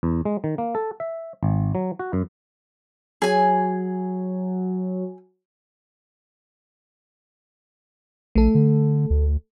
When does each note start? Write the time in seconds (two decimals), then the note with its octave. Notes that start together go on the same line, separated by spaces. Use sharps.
0.03 E2
0.25 G#3
0.44 D#3
0.58 A#3
0.75 A4
1.00 E5
1.43 G#1
1.75 F#3
1.99 F#4
2.13 F#2
3.22 F#3 G#4 G#5
8.35 A#1 A3 A4
8.55 D3
9.10 D2